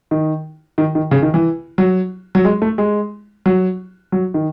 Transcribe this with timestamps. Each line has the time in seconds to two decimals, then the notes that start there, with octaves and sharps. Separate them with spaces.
0.11 D#3
0.78 D#3
0.95 D#3
1.11 C#3
1.22 D#3
1.34 E3
1.78 F#3
2.35 F#3
2.45 G#3
2.62 A3
2.78 G#3
3.46 F#3
4.12 F#3
4.34 D#3